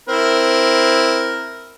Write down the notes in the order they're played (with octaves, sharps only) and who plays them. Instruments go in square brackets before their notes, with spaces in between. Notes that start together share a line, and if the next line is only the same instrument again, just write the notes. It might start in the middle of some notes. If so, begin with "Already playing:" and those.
[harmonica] C4 E4 A#4